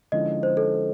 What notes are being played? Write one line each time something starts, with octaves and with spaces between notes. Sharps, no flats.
D3 F3 G#3 C#4 E4 D#5
C5
A4